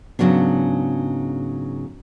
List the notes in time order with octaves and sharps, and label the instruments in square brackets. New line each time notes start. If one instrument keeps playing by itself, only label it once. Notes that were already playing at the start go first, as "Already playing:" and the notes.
[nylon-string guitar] G#2 C#3 F#3 B3 D4